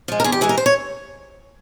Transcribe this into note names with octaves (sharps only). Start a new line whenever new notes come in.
F3 G#3
A#4
E2 G#4
G4
E3 G#3 G#4
A#4
C5
C#5